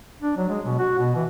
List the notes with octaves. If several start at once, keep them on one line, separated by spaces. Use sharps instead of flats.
D4
F#3
G#3
B2
F#4
B2
E3